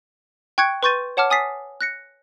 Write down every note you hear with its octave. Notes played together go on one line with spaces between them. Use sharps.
G5 C#6 F#6 G#6 C#7 D7
B4 C6 C#6 G6 A6 D#7
C#5 F#5 A5 D6 F6
G#5 D#6 A6 B6 C7
F#6 A#6 C#7